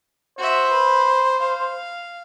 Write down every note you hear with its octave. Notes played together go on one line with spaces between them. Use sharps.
F#4 C5 E5
B4
F5